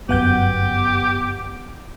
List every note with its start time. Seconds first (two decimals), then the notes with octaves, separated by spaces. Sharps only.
0.09 G1 F#2 B3 G4 F#5 G6